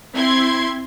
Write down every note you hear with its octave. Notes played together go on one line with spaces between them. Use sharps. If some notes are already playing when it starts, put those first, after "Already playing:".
C4 E4 C6 G#6